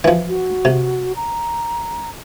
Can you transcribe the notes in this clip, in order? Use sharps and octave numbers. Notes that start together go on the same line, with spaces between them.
E3 F3
F#4
C3
A#5